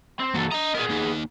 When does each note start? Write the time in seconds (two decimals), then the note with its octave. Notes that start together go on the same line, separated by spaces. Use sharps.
0.20 C4
0.35 E3 F#3 A#3 A4
0.52 D4 D#5 A#5
0.74 B3 G#4 A#4 D5
0.90 A#3 D#4